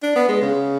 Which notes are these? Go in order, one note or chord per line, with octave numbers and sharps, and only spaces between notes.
D4
B3
G#3
C#3